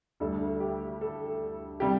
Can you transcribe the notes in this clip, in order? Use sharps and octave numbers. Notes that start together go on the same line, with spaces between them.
D2 D3 G3 A4
G4
A4
C3 G3 G4